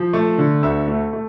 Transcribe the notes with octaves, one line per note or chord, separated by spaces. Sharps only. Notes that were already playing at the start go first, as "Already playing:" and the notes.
Already playing: F3
A3
D3
D2 E5
A3
A3